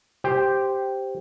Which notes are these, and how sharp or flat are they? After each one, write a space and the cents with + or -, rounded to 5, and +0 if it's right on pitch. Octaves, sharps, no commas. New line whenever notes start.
G4 +0 C5 +0 G5 +5